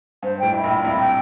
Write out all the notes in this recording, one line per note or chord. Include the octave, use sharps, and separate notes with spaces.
G2 C5
A1 A2 G5
E4
A#1 A#2
G5
C2 C3 E4
G5